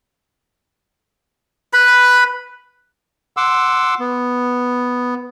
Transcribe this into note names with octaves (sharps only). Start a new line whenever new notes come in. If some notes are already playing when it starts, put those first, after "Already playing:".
B4 B5
F#5 C6 D6 E6
B3